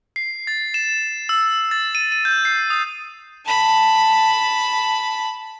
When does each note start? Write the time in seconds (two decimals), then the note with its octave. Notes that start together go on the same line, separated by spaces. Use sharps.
0.16 C7
0.47 A6
0.74 E7
1.29 E6
1.71 A6
1.95 D#7
2.12 D#7
2.25 G6
2.45 C7
2.70 D#6
3.45 A5 B5